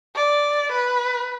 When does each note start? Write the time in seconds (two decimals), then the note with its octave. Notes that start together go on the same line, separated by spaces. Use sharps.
0.16 D5
0.72 B4